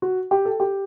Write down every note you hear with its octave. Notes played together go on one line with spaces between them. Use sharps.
F#4
G4
A4
G4